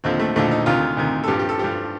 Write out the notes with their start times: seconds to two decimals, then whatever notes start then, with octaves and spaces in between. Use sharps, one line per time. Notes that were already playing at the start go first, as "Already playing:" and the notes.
0.04 D#2 D3 F3 C4
0.20 A3
0.36 D#2 D3 F3 A3
0.51 D#4
0.66 D2 C3 D#3 F4
0.97 D2 C3 D#3
1.24 A4
1.28 G2 F3 G4
1.39 G4
1.49 A4
1.59 G2 F3 G4